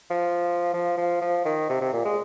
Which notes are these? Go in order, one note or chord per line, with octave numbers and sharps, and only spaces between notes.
F3
F3
F3
F3
D#3
C3
C3
A#2
G#3